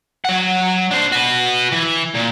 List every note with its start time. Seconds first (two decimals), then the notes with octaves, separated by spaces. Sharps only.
0.25 F#3 F#5
0.91 D4 C5
1.12 F#4 B4
1.72 E3
2.14 A#2